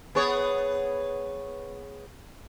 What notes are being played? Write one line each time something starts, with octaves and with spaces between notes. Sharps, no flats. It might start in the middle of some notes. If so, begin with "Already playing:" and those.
B3 G#4 C#5